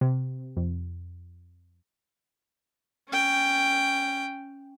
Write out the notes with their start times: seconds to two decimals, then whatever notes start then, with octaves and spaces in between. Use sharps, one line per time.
0.01 C3
0.57 F2
3.09 C#4 G5